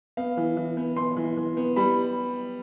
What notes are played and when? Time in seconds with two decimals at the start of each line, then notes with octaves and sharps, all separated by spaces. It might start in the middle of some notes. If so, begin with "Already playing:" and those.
0.17 B3 F5
0.37 E3
0.57 E3
0.77 B3
0.96 B3 C6
1.17 E3
1.37 E3
1.57 B3
1.76 G3 B5